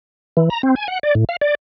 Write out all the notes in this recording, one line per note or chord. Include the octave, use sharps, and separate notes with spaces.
E3
A#5
C4
G#5
F#5
D5
A2
F5
D5